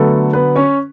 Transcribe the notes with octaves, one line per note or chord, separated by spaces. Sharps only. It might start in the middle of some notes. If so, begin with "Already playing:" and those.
Already playing: D3 F#3 A3 B3 A4
B3 B4
C#4 C#5